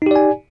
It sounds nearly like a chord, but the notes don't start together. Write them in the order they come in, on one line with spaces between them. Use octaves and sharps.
D#4 G4 D5 G#5